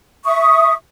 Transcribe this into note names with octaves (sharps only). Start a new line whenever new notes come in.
E5 C#6 D#6